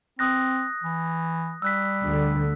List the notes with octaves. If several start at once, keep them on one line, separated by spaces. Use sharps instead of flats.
C4 D#6 F#6 A#6
E3
G3 E6 F#6 B6
D2 D3